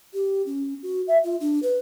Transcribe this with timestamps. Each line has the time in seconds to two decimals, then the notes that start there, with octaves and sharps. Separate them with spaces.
0.14 G4
0.46 C#4
0.83 F#4
1.08 E5
1.24 F4
1.40 D4
1.63 B4